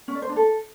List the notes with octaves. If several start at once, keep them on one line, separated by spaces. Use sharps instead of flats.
C#4
D5
C5
D4
A4